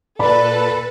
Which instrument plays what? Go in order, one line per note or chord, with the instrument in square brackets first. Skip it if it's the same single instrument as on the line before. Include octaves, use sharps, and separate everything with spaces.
[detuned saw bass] A#2 [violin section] A4 B4 [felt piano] D5 B5